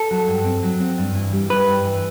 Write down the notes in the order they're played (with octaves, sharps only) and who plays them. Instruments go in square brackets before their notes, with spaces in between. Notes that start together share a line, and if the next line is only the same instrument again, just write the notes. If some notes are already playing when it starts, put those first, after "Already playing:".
Already playing: [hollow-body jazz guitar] A4
[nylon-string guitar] F#3
G2
C4
F#3
C4
G2
E3
G3
[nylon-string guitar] G3 [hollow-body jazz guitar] B4
[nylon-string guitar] G2
E3